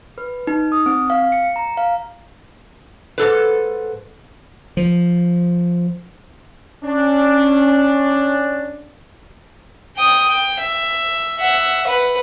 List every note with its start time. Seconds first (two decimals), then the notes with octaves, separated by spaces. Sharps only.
0.18 B4
0.47 D#4
0.72 D#6
0.86 C4
1.10 F5
1.32 C#7
1.56 A#5
1.77 F5
3.18 G#2 A4 B4
4.77 F3
6.85 C#4 D4
9.97 G5 D#6
10.27 G5
10.60 E5
11.39 E5 F#5
11.87 B4 F#5